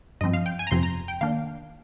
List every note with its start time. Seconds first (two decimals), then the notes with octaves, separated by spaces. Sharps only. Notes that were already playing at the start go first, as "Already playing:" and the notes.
0.21 G2 F3 C4 D#5
0.33 F5
0.46 G5
0.59 G#5
0.67 A#5
0.71 F2 C3 F3 C4 C6
0.83 A#5
1.08 G5
1.21 D#3 A#3 D4 F5